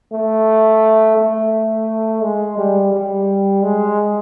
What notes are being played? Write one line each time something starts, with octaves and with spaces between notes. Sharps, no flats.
A3
A3
G#3
G3
G3
G#3